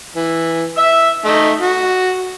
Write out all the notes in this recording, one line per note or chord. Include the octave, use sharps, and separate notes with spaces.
E3
E5 E6
A3 D#4
F#4